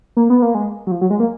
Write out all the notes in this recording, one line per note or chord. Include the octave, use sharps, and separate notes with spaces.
A#3
B3
A#3
G#3
F#3
F3
F#3
G#3
A#3